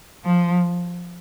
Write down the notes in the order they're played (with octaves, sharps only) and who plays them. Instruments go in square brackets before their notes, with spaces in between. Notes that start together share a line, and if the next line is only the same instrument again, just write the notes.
[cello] F3